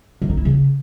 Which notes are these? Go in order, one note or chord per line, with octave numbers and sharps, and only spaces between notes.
D3
D#4
E4
C#3